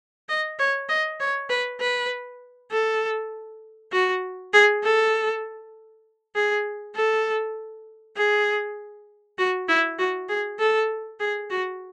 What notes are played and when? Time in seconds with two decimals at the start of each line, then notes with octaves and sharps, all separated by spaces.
0.29 D#5
0.59 C#5
0.89 D#5
1.20 C#5
1.50 B4
1.80 B4
2.71 A4
3.93 F#4
4.53 G#4
4.84 A4
6.35 G#4
6.96 A4
8.17 G#4
9.38 F#4
9.68 E4
9.99 F#4
10.29 G#4
10.59 A4
11.20 G#4
11.50 F#4